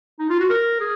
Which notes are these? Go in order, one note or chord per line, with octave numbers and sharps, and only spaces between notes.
D#4
F4
F#4
A#4
G#4